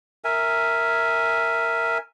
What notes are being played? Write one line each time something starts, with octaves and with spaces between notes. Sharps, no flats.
A#4 E5 G#5